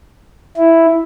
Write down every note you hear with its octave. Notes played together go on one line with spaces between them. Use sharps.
E4